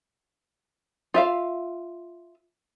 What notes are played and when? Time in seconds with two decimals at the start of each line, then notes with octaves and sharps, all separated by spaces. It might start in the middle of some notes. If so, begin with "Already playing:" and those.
1.14 F4 E5 F5